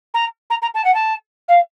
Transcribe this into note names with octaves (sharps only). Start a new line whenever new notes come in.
A#5
A#5
A#5
A5
F#5
A5
F5